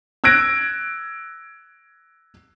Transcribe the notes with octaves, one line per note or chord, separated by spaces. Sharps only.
E6 F#6 G#6 A#6 D7